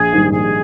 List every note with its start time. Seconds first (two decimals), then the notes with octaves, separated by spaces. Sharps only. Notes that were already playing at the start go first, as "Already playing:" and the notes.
Already playing: A#1 G#4
0.12 G#2 D#3 G3
0.31 A#1 G#4